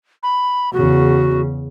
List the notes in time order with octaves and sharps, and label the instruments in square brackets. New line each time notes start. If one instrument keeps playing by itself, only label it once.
[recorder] B5
[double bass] E2 C#3 [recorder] F#4